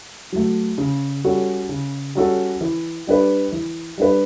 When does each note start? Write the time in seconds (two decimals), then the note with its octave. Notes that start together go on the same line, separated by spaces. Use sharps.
0.32 F#3 A3
0.78 C#3
1.25 G3 C#4 F#4 A4
1.69 C#3
2.15 G3 C#4 F#4 A4
2.61 E3
3.07 G3 D4 G4 B4
3.52 E3
3.98 G3 D4 G4 B4